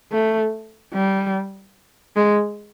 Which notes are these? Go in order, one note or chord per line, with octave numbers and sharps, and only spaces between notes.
A3
G3
G#3